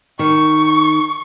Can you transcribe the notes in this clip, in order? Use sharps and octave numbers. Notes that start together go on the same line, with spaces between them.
D#3 C#6